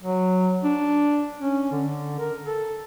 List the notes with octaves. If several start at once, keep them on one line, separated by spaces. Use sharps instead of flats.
F#3
D4
C#4
D3
A#4
A4